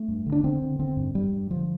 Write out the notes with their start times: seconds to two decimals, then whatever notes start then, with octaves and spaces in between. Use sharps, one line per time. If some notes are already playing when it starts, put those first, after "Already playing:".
Already playing: A3
0.08 G2
0.26 D3
0.32 D4
0.44 D3 C4
0.62 D3
0.79 D3 C4
0.97 G2
1.14 G2 G3
1.33 G2
1.50 D3 F3